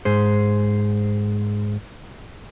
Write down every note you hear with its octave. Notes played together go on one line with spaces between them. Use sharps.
G#2 G#4 C5